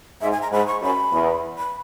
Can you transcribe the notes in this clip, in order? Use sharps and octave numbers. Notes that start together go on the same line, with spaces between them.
G#2 E5
G#5
A#5
G#2 B5
C#6
F#2 B5
E2
B5